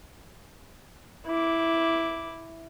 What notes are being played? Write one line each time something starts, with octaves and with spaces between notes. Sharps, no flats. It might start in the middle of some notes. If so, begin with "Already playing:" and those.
E4 D6